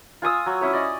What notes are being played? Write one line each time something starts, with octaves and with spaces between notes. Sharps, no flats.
F4 G#5 D#6 E6
F#3
C#4 E4 C#5
D5 D#5